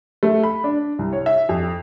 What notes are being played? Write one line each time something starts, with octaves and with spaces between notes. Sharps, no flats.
A3
B5
D4
C2
C#5
E5
F2